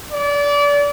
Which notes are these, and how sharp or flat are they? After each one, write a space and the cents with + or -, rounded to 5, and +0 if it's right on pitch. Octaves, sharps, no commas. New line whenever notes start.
D5 -30